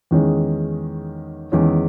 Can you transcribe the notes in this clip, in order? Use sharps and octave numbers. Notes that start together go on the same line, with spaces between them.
E2 D#3 G#3 C#4
E2 D#3 G#3 C#4